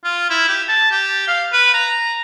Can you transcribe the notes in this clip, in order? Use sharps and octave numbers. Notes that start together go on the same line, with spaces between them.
F4
E4
G4
A5
G4
F5
B4
A#5